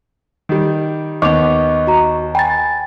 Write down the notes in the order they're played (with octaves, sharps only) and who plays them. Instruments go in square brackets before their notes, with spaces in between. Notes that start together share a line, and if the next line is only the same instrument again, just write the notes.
[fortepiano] D#3 G3
[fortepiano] D#2 B3 [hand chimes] D#5 C#6 [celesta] D6 F7
[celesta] F#4 A#5
[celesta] G5 B5 [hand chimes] G#5 A6